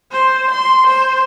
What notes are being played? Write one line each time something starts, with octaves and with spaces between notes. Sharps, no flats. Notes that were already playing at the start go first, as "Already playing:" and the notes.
C5
C6
C5